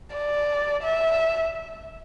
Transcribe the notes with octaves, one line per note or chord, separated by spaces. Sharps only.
D5
E5